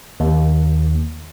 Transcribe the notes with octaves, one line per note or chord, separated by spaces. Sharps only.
D#2